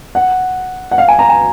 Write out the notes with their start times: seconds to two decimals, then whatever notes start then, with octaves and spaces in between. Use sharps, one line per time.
0.15 F#5
0.91 F#5
0.98 F5
1.08 G#5
1.19 A#5
1.29 G#5